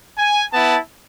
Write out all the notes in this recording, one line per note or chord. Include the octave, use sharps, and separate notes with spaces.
G#5
B3 E4 A5